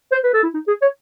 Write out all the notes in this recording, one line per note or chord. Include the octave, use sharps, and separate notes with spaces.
C5
B4
A4
E4
D#4
G#4
C#5